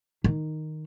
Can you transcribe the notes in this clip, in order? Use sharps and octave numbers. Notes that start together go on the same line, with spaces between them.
D#3